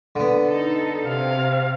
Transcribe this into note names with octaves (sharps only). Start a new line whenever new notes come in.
D3 B3
D#4 A4
C3 F5